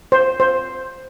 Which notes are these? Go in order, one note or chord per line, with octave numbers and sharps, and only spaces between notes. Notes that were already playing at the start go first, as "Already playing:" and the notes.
C5
C5